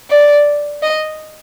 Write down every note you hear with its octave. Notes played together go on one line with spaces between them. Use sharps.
D5
D#5